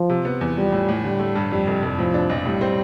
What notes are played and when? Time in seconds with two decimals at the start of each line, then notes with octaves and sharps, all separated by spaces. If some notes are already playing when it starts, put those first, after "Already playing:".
Already playing: F3
0.10 C3
0.25 B3
0.41 E2
0.57 F3 G3
0.72 A2
0.89 A2
1.04 D3 G3
1.19 A3
1.35 G2
1.51 F2 G3
1.67 F1
1.83 F1
1.98 A2 F3
2.14 D4
2.30 B1
2.45 A2 G3
2.61 C4